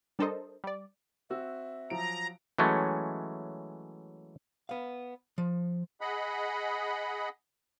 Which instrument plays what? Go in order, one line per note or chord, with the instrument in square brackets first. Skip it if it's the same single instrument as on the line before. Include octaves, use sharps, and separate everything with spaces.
[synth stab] G3 D4 A4 A#4 C5 D#5
G3 D5
[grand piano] C4 F#4 E6 [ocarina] E5
[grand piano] F3 F#3 D7 [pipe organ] A#5
[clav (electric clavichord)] E3 F#3 G#3 A3 C#4
[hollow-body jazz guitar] B3 F5
F3
[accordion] G#4 D#5 F#5 B5